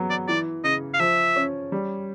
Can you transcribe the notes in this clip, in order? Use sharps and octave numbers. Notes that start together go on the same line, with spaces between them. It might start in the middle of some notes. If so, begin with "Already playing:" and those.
Already playing: F#3 B3
D5
E3 D5
C#3 D#5
F5
F3 E5
C#4
G3